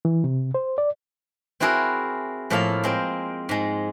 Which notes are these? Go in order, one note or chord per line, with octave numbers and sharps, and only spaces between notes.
E3
C3
C5
D5
C4 E4 F#4 G#4 A#4
A2 F3 A#3 A4 A#4 F5
G#3 C4 A#4
G#2 G#3